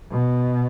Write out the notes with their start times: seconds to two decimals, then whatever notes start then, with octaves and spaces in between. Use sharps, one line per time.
0.12 B2